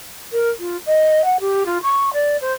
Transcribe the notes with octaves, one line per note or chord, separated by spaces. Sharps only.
A#4
F4
D#5
F#5
G4
F4
C#6
D5
C5